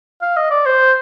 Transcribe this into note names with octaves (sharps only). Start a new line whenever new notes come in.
F5
D#5
D5
C5